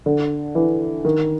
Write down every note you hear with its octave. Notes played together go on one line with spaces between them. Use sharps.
D3
E3
D#3